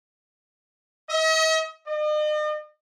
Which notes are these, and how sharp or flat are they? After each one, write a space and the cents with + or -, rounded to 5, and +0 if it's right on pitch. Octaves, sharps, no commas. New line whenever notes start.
D#5 +45
D#5 -45